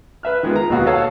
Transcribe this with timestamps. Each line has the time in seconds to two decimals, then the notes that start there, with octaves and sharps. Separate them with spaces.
0.23 B4 E5 F6
0.43 D#3 G#3 B3 F4
0.56 A#5
0.70 D#2 B2 F#4 F5
0.86 A4 C#5 D#5 F5 F#5 A5